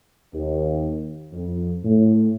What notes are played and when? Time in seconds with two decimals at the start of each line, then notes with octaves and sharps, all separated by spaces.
0.34 D#2
1.33 F2
1.85 A2